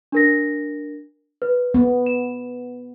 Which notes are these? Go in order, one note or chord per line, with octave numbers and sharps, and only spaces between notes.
D4 A#4 A#6
B4
B3
E7